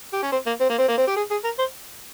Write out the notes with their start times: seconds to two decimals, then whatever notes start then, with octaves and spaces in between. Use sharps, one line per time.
0.13 G4
0.22 C#4
0.32 C4
0.46 A#3
0.60 C4
0.70 A#3
0.78 C4
0.88 A#3
0.97 C4
1.07 G4
1.16 G#4
1.31 G#4
1.44 A#4
1.58 C5